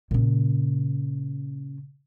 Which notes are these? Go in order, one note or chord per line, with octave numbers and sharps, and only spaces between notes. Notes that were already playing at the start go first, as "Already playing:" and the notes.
A#2 C#3